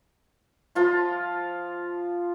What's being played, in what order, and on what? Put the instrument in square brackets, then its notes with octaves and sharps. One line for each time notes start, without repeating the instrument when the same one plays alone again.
[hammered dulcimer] F3 F4 C6